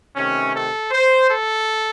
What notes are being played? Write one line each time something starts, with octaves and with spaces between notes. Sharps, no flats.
C3 D#3 A3 C#4
A4
C5
A4